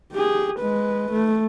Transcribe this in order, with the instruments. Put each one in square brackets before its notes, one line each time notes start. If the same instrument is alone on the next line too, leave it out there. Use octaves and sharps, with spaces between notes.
[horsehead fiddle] G4 G#4
G#3 B4
A3